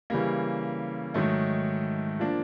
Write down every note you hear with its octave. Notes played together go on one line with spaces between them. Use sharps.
C#3 E3 G3 A#3
G#2 D#3 F#3 A3
F3 A#3 D4